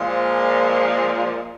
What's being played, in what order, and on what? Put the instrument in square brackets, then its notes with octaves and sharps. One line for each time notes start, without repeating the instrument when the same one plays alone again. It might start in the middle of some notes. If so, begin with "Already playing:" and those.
Already playing: [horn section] A#2 F3 G#3